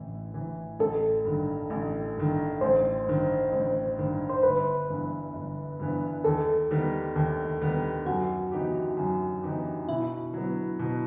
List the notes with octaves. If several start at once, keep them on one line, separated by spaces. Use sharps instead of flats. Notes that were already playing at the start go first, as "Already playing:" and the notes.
Already playing: A1 A2 E3
A2 E3
A1 A4
G2 D#3
A1
G2 D#3
A1 C5
G2 D#3
A1
G2 D#3
C5
G1 B4
G2 E3 B3
G1
G2 E3 B3
D#2 A4
D#3 G3 B3
D#2
D#3 G3 B3
F#2 F#4
E3 B3 D#4 G4
F#2
E3 B3 D#4 G4
B2 E4
F#3 B3
B2